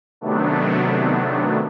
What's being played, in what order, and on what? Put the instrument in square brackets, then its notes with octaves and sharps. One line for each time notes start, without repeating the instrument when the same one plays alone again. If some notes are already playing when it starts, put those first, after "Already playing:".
[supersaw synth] C3 D#3 F#3 A3 B3 D4